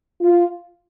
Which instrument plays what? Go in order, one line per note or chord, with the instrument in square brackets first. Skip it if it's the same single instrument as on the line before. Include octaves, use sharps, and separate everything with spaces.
[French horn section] F4